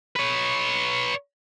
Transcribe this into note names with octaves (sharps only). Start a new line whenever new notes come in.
B4 C#5